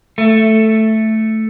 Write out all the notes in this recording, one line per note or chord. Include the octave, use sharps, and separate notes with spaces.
A3